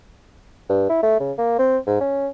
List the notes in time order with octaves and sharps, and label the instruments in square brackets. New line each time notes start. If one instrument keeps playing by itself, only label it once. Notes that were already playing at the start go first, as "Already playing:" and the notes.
[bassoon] G2
E4
A3
C#3
A#3
C4
G#2
C#4